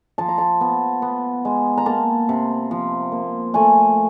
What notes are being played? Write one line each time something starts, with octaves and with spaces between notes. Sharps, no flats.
F3 A5
A#5
A5
B3
B3
G#3
A#5
A#3 A5
C3
F3
A#3
A3 G#5